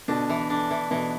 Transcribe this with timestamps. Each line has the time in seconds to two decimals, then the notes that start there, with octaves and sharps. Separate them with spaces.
0.08 B2 D3 D4
0.29 E3
0.50 D4
0.70 E3
0.91 B2 E3